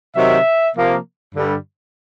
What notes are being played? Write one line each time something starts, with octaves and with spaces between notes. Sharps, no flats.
C3 D#3 F#3 E5
C3 F3 A#3
G2 D3 G3